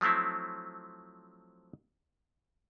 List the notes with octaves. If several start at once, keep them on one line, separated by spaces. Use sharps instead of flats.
F3 F#3 A3 C4 E4